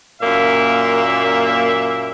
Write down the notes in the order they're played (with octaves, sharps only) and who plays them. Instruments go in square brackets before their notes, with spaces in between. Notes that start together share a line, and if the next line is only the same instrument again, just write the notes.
[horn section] F#2 A#2 A#3 E5